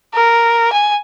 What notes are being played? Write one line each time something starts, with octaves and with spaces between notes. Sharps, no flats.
A#4
G#5